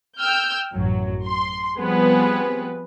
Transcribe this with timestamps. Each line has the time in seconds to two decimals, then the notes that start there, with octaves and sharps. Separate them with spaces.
0.18 G5 E6 F6 G6
0.75 A1 F#2 F#3
1.24 C6
1.79 F3 G3 B3 C4 G#4 B4